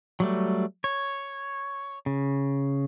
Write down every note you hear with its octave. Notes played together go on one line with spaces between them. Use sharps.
F#3 G3 A3
C#5
C#3